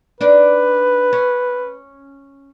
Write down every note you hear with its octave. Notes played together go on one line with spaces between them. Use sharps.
D4 D#4 B4 D5
C#4